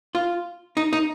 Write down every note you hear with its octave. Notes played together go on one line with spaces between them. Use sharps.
F4
D#4
D#4